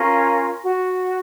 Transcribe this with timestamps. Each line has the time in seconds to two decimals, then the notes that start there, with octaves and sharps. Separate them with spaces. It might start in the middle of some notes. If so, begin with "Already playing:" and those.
Already playing: C#4 F4 A#4
0.63 F#4